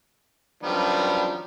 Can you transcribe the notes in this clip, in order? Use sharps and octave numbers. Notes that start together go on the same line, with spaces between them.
F#2 D#3 F3 G3 B3 D4